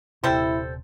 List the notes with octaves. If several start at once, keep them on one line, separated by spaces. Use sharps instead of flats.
D#1 C3 G3 E4 A4 C5